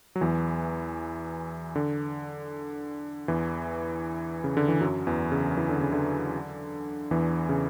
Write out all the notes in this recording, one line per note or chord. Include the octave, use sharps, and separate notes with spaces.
F#3
E2 E3
D3
E2 E3
C#3
D3
E3
F#2 F#3
E2 E3
C#3
E3
D3
C#3
D3
E2 E3
C#3